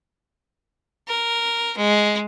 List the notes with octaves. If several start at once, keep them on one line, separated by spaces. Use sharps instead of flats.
A#4
G#3